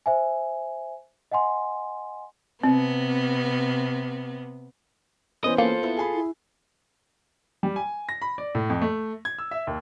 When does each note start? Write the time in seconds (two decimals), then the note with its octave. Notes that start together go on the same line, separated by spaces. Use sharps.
0.06 C5 E5 G#5
1.31 D#5 F#5 G#5 C6
2.64 C3 B3 C4
5.44 E3 B3 C#4 C5 D#5
5.58 A#3 F4 A4
5.82 B3 E4
5.97 G#4 G#5 B5
6.14 E4
7.63 G3
7.76 G#5
8.09 A#6
8.22 B5
8.38 D5
8.55 A2
8.70 F2
8.81 A3
9.25 G#6
9.39 E6
9.51 E5
9.67 D#2